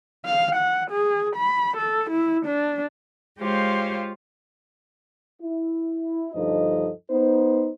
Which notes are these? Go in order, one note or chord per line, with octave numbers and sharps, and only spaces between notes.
F5
F#5
G#4
B5
A4
E4
D4
G#3 F4 G4 C5 C#5 F5
E4
D2 G2 F3 D#4 A4 D#5
B3 D#4 C5